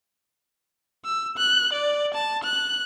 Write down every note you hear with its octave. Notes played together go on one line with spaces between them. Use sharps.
E6
F#6
D5
A5
F#6